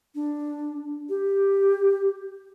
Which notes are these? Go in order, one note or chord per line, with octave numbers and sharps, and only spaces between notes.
D4
G4